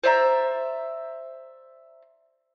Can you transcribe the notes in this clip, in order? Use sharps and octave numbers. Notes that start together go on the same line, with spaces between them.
C5 D5 E5 A#5